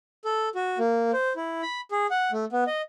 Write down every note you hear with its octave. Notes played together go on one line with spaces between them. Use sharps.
A4
F#4
A#3
C5
E4
B5
G#4
F#5
A3
B3
D#5